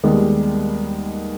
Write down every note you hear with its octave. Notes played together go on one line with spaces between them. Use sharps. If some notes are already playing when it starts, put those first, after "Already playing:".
D#2 D#3 G3 G#3 B3